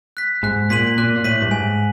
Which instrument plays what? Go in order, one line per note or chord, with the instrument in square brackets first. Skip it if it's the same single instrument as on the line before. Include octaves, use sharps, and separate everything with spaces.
[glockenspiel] F#6 B6
[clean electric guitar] G#2 [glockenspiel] F#6
[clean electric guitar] A#2 [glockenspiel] B6 D#7 F#7
[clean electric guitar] A#2 [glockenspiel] F#6
[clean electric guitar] A#2
[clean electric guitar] A2 [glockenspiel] B6 D#7 F#7
[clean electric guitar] G2
[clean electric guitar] G#2 [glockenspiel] G#5